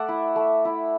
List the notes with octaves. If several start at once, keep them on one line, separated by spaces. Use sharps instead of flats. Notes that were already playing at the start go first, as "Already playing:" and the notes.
Already playing: A3 D5 E5 F#5
E4
A3
E4